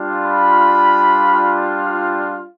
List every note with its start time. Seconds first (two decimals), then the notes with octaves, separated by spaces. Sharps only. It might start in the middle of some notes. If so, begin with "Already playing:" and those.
Already playing: G3 D4 F4
0.24 B5